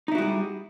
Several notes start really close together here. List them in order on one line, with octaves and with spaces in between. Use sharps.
D#4 E4 F#4 G3 G#4